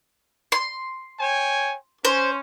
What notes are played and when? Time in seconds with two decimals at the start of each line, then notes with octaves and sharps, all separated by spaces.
0.52 C6
1.20 C#5 G5 G#5
2.05 C#4 C5